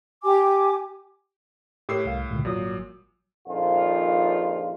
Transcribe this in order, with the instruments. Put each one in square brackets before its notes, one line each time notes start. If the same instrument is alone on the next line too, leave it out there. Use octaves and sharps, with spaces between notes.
[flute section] G4 G#5 D6
[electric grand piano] A2 E6 C7 [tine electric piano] G4 A#4 C#5
[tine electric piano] C2 F5
C#2 A#2 D3
[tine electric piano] G#1 F#3 D#6 [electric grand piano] A#2
[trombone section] A#1 F2 A#2 D#3 F4